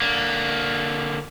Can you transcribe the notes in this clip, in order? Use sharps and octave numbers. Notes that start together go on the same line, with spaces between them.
D3 A#3